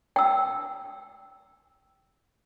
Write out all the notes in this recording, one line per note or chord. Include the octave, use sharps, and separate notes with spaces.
G5 E6